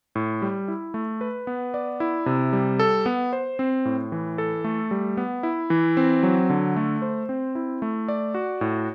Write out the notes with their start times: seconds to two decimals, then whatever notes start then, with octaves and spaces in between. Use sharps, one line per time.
0.15 A2
0.42 G3
0.68 E4
0.94 A3
1.21 B4
1.47 B3
1.74 D5
2.00 E4
2.26 C3
2.53 G3
2.79 A4
3.06 B3
3.33 C5
3.59 C4
3.85 A2
4.12 E3
4.38 A4
4.64 A3
4.91 G3
5.17 B3
5.43 E4
5.70 E3
5.97 C4
6.23 F#3
6.50 D3
6.76 A3
7.02 C5
7.29 C4
7.55 E4
7.82 A3
8.08 D5
8.34 F#4
8.61 A2